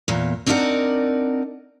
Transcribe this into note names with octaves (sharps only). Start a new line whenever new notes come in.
E2 A#2
C4 D4 D#4 A#4 D5 F#5